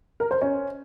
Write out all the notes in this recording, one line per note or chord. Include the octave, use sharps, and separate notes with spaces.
A#4
C5
C#4